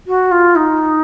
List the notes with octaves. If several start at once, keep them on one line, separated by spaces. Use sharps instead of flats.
F#4
F4
D#4